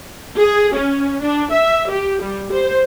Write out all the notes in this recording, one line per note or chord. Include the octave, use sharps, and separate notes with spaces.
G#4
C#4
D4
E5
G4
G3
C5